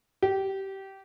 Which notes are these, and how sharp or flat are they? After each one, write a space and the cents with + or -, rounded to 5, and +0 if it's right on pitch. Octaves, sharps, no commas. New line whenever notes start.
G4 -20